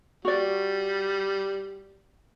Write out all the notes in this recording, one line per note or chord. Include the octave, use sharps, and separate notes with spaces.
G3 F#4 D5